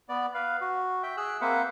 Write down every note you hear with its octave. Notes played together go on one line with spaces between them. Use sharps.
B3 D5
B4 F5
F#4
E5 G5
G#4 E6 F#6
A#3 C4 B4 C5 E5 F#5